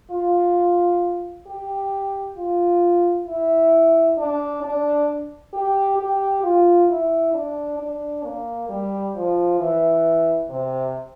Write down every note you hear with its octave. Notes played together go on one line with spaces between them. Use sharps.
F4
G4
F4
E4
D4
D4
G4
G4
F4
E4
D4
D4
A#3
G3
F3
E3
C3